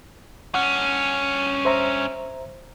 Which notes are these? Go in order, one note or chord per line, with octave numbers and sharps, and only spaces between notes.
G2 C#4 F#5
C5 E5 A#5